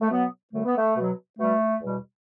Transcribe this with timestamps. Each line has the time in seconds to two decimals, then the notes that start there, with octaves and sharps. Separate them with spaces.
0.01 A3
0.10 B2 F#3 B3
0.53 F#2 D3 G3 A3
0.65 B3
0.77 A3
0.96 B2 F#3
1.38 B2 G3 A3
1.82 E2 B2 G3